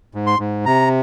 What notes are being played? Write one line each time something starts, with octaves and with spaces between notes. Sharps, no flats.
G#2
C6
G#2
C3 A#5